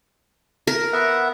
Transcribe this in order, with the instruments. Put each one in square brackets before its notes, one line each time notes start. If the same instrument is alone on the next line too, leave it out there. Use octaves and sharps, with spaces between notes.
[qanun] A#4
[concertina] B3 E5 F#5